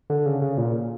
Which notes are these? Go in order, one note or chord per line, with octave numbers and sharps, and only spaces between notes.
D3
C#3
C#3
A#2